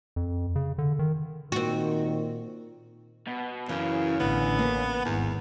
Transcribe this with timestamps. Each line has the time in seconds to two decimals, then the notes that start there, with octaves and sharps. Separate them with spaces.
0.16 F2
0.56 C#3
0.78 D3
0.99 D#3
1.52 A#2 D#3 C4 F#4
3.27 B2
3.69 F#2 C#3 E3
4.20 A1 D3 B3
4.59 A#3 B4
5.05 G#1 E2